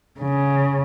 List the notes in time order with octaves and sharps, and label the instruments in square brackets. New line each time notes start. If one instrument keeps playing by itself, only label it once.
[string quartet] C#3